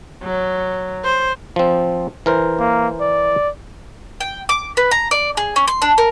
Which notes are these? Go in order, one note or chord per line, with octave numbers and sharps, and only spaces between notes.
F#3
C5
F3 C4
E3 A#4 C5
A#3
D5
G5
D6
B4
A#5
D5
G#4
C#4
C6
D4
A#4